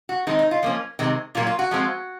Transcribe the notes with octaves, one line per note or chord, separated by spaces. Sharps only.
F#4
D#3 G#3 C4 D#4
D#4
F4
F3 A#3 C#4
C3 D#3 G#3 C4
A#2 F#3 A#3 F4
F4
F#4
F3 G#3 C4